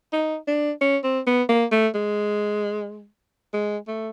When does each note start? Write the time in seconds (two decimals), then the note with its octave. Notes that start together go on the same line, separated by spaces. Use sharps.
0.13 D#4
0.48 D4
0.81 C#4
1.04 C4
1.27 B3
1.49 A#3
1.72 A3
1.95 G#3
3.54 G#3
3.88 A3